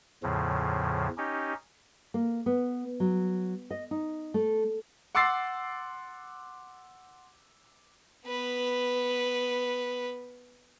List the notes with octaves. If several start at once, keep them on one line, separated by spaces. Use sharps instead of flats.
E2 A2 C#3 F3
C#4 D#4 G4
A#3
B3
F#3
D#5
D#4
A3
F#5 C6 D6 E6 A6 C7
B3 B4